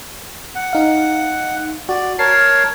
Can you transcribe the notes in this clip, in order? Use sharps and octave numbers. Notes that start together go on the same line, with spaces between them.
F#5
D#4 F5
F#4 D5
A#4 C#5 A5 C7